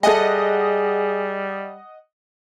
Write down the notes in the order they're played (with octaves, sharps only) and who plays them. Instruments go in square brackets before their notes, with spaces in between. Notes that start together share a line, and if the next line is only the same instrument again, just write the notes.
[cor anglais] G3 [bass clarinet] G#4 [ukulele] A4 E5 G#5 [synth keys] D#5 F#5